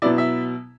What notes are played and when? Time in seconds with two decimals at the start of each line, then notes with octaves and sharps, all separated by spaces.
0.02 B2 F#3 B3 E4 D5
0.18 E5